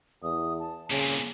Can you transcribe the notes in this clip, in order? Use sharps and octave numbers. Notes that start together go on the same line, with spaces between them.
E2 D#6
A5
C2 A#2 C#3 G#5